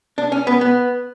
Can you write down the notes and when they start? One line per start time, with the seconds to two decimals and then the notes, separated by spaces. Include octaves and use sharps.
0.18 D4
0.32 C#4
0.47 B3
0.61 B3